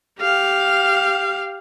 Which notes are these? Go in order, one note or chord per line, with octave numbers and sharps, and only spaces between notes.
G4 F5